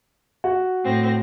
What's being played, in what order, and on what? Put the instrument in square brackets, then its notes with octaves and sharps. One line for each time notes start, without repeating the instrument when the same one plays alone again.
[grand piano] F#4
[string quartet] A2 C4 A#6